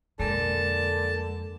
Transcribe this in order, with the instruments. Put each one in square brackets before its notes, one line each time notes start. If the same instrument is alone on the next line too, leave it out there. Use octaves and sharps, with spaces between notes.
[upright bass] F2 B2 [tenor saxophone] D3 [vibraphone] G#3 A#3 A#4 [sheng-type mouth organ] A5